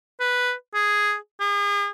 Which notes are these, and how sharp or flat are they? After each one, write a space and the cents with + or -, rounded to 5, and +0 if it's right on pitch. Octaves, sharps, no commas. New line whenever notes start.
B4 +0
G#4 +0
G#4 -40